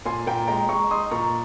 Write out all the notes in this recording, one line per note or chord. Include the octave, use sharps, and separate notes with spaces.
A#2 G#5 C6
A#2 G5 A#5
G#3 G5 A#5
G#3 A#5 C#6
D#4 C6 D#6
A#2 A#5 C#6